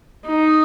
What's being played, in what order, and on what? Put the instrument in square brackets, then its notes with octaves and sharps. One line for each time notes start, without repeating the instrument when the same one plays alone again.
[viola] D#4